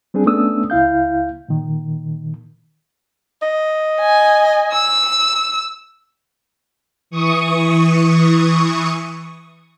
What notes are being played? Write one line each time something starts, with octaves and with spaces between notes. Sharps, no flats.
G3 C4 D4 G#4
A3 B3 C#4 D4 D#6 E6
C#2 E4 F5 G6
A#2 D#3
D#5
G#5
E6
E3 C#6 D#6